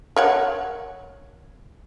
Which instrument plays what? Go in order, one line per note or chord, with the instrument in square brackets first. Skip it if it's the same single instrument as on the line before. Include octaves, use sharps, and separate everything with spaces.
[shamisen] A#4 C#5 F#5